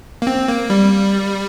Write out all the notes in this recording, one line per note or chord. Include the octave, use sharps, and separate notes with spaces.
A#3
C4
A#3
G3